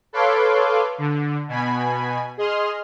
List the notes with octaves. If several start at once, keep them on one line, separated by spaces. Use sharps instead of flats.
A4 B4 C#5 F5 C6 D6
D3
B2 G#5 B5
G#4 D#5 C6 F6